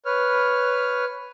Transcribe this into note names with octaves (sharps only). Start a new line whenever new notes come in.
B4 C#5 F6